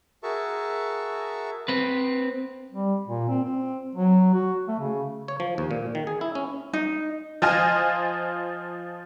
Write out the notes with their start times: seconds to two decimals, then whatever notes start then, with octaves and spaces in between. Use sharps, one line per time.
0.23 F#4 G#4 A#4 E5 A5 C#6
1.68 C4 B4
2.72 G3
3.08 A#2
3.29 C4
3.44 C4
3.95 F#3
4.34 F#4
4.68 A3
4.80 C#3
5.28 C#5
5.40 F3
5.58 D#2
5.71 A#2
5.95 D#3
6.07 G#4
6.21 E4
6.35 C#4
6.73 D#4
7.42 F3 F4 C5 D#5 G#5 F6